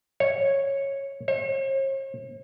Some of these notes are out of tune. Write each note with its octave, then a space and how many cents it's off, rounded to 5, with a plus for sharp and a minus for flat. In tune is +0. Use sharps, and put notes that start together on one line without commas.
C#5 -10
C#5 -45